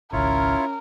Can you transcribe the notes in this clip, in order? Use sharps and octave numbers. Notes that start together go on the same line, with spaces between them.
G#1 C#2 C#4 E4 F4 A#4 C#5